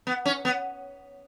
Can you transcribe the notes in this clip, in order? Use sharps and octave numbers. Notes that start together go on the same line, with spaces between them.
B3
C#4
B3